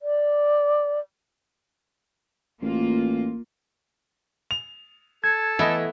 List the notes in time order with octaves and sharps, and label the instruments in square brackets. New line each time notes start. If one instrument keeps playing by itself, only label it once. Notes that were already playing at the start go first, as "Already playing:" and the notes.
[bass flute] D5
[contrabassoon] A1 [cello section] A#3 F4
[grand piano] F7
[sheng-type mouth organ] A4 A5 [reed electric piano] G#6
[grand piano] E3 D#5 [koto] A3 B3 E4